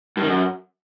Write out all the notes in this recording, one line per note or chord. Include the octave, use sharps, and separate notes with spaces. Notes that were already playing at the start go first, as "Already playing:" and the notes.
G2
D#3
F#2